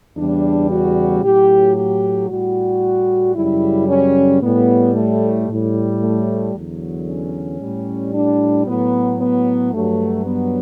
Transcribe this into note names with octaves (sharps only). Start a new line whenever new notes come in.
E2 C#3 G3 D4
F#4
A2 F#3 G4
G4
A2 G3 F#4
F#2 C#3 G3 E4
C#4
A2 G3 B3
A3
A2 G3
A3
E2 D3 F#3
C#4
A2 G3
D4
A2 F#3 B3
B3
G2 F#3 A3
B3